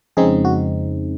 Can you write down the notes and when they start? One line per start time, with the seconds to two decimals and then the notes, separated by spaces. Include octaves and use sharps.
0.17 F2 C#3 G#3 C4 D#4 G#4
0.45 F#4